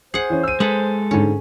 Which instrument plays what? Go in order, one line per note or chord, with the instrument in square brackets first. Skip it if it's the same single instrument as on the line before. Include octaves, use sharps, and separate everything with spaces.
[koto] G#4 F#5 [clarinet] C5 [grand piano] C7
[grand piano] E3 C#4
E6 D#7
[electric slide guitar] G#3 A4 [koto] G#4 B4
[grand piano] G#2 D3 [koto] C#4